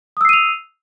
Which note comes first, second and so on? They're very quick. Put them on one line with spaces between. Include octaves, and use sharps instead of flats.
D#6 E6 C7 D#7 F7